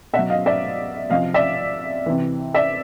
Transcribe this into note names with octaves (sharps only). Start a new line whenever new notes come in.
B2 E5 F#5
F#3
D#5 F5
D5 E5
C3 F3 D#5 F5
D5 E5
C3 E3
D5 E5